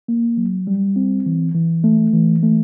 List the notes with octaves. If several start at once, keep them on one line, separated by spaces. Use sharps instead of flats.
A#3
F#3
G3
C4
E3
E3
A3
E3
A3